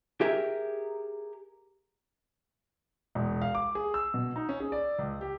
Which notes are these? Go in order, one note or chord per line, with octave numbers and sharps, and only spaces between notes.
G4 G#4 A#4 E5
E1
F5
D6
G#4
E6
B2
D#4
C#4
G#4
D5
C#2
G4